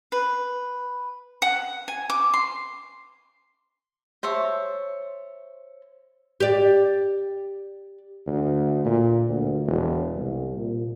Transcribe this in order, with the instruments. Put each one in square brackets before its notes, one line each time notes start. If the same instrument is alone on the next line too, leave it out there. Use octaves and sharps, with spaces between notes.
[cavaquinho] B4
F#5
G#5
D6
C6
C5 C#5 E5 A5
[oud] G4 D5
[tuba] D2
A#2
D2
E1
C2
A#2